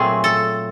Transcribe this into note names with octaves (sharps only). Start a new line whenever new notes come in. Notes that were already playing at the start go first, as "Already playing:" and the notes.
Already playing: A#2 F#3 A3 C4 G#4
A4